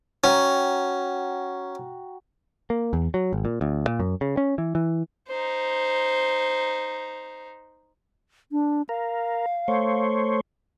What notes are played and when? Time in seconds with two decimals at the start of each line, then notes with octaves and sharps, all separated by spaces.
0.24 C#4 F#4 G5 A#5
2.70 A#3
2.93 E2
3.14 F#3
3.33 G#1
3.45 A#2
3.61 D2
3.87 A#2
3.99 F#2
4.21 C#3
4.37 C#4
4.58 E3
4.75 E3
5.28 D#4 C5
8.52 D4
8.89 A#4 F5
9.68 A3 C5 C#5